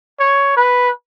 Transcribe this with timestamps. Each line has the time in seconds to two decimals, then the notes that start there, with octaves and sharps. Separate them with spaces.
0.20 C#5
0.57 B4